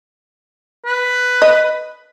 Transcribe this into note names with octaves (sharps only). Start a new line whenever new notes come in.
B4
D#5